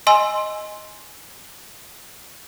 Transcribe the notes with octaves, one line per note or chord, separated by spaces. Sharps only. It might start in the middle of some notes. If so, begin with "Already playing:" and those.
D#5 G#5 C6 E6